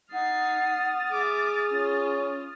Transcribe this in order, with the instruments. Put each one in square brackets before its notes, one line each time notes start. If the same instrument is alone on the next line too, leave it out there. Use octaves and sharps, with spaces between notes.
[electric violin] D#4 C7 [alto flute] F#5 [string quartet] D#6 F6 A6
[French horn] G#4 [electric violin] E5 D6
[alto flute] C#4 [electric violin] F4